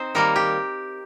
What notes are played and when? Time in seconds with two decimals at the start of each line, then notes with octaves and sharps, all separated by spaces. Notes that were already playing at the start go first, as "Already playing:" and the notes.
Already playing: C4 D#4 C5
0.15 D#3 G3 A#3 A#4
0.36 G4